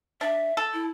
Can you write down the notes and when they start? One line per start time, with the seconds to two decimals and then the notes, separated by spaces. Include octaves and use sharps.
0.21 D4 E5
0.57 A4
0.73 E4